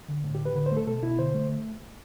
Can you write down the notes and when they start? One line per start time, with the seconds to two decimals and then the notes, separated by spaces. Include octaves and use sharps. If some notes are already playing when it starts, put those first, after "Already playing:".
0.08 D3
0.24 A2
0.35 G4
0.40 A2
0.45 B4
0.55 D3 B4
0.66 C5
0.72 A3
0.77 A4
0.87 B2 A4
1.03 B2 E4
1.19 D3 C5
1.34 A3